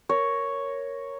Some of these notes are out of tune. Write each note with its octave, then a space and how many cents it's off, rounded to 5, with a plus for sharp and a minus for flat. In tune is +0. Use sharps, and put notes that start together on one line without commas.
A#4 +0 C#5 +0